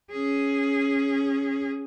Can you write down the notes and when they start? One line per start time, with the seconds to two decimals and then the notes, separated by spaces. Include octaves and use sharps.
0.12 C#4 G#4